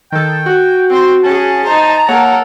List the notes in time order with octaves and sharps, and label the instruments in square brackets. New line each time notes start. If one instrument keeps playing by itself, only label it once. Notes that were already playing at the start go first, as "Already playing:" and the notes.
[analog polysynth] D#3 A4 [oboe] G5
[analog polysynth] F#4
[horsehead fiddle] C4 C5
[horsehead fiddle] C#4 G#4 [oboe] A5
[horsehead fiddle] D#4 C5 [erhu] A#5
[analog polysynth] A#3 C#5 F#5 [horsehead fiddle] A4 A#4